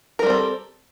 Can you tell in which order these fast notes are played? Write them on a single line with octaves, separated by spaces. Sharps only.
A#4 G3 C4 A4